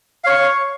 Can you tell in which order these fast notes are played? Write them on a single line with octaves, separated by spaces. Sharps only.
F5 C#5 C#6